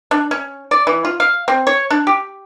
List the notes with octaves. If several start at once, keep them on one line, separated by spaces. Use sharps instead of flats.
D4
C#4
D5
E3
F4
F5
C4
C#5
D4
G4